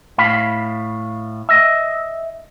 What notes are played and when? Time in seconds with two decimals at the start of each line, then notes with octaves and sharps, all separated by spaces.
0.18 A2 F5 B5
1.49 D#5 E5